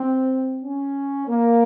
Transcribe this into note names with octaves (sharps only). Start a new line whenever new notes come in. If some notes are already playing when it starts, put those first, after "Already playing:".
Already playing: C4
C#4
A#3